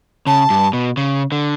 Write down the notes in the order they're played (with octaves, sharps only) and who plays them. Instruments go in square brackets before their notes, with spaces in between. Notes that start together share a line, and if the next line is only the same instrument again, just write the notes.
[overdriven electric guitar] C#3 [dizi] A5
[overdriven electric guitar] G2
B2
C#3
D3